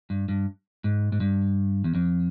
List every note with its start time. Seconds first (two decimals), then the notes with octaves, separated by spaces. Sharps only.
0.10 G2
0.29 G2
0.84 G#2
1.12 G#2
1.20 G2
1.84 E2
1.95 F2